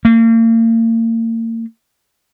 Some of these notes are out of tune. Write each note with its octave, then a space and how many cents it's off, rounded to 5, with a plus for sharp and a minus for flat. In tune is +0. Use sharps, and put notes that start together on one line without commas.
A#3 -40